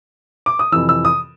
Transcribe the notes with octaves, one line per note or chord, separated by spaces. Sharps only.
D6
D#6
F2 C3 E3 E6
E6
D#6